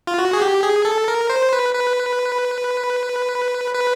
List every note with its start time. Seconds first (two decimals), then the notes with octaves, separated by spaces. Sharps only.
0.07 F4
0.18 F#4
0.33 G#4
0.41 G4
0.63 G#4
0.85 A4
1.08 A#4
1.30 C5
1.53 B4
1.74 B4
3.74 B4